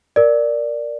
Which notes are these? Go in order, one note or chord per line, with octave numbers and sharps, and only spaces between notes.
A#4 D5